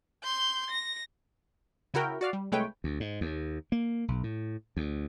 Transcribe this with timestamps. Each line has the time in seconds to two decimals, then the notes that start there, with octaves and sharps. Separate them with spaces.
0.23 C6 G6
0.70 A#6
1.94 C#3 E4 F#4 A#4 G5
2.21 F#4 D5 F5
2.33 G3
2.52 C2 G#3 A3 B4 C#5 G5
2.84 D2
3.00 G#2
3.21 D#2
3.72 A#3
4.08 B1
4.23 A2
4.77 D2